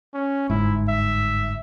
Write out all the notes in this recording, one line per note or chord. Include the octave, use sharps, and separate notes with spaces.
C#4
G1 G#2 E4
E5